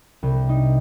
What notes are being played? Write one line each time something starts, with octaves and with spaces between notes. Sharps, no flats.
C2
D#4